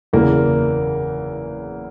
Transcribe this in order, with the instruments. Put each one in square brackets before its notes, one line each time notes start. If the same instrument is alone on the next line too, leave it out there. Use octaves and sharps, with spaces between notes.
[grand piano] F#1 E2 C#3 E3 A#3